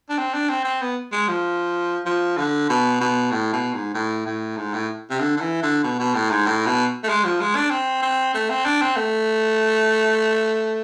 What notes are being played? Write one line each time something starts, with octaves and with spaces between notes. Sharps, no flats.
D4
C4
D4
C4
C4
B3
G#3
F3
F3
D3
B2
B2
A2
B2
G#2
A2
A2
G#2
A2
C3
D3
D3
E3
D3
B2
B2
A2
G#2
A2
B2
A3
G#3
F3
G#3
D4
C4
C4
A3
C4
D4
C4
A3